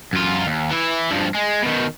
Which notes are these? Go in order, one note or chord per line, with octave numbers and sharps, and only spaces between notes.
F#2 F4
D#2
E3 E4
G2 F3
G#3
B2 D#3